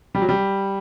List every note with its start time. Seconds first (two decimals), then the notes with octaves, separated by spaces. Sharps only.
0.15 G3
0.22 F#3
0.29 G3